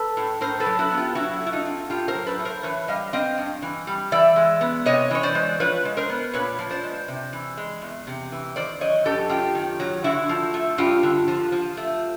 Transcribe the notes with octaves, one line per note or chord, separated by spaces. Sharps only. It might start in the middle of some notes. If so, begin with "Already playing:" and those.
Already playing: A4 B4
A2
A2 A#4 C5
A4 B4
F#3
E4 F#4
B3
F4 G4
F#3 E4 F#4
A3
E4
D#4 F4
C4
A2 F4 G4
A#4 C5
F#3
A4 B4
A3
A#4 C5
E3 B4 C#5
G3 D#5 F5
C4 D#5 F5
G2
E3
G3
E3 D5 E5
G#3
B3
C3 C#5 D#5
E3 C#5
C5 D5
G#3
F3 B4 C#5
G#3
A#4 C5
B3
A#2 B4 C#5
F3
C5 D5
G#3
C3
E3
G#3
E2
C3
E3
D#3 C5 D5
F#3 C#5 D#5
F#2 G4 A4
F#2 F4 G4
D#3
F#3
D3 E4 F#4
F3
A3
G2 F4 G4
D3
F3
F3
A3